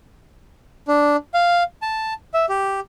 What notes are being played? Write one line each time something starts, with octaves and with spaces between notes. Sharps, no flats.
D4
F5
A5
E5
G4